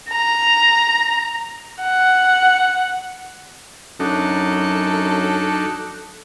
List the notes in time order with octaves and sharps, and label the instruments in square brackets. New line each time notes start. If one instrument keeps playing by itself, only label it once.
[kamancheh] A#5
F#5
[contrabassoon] F#2 [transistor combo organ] F#3 D4 D#4 [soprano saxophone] A4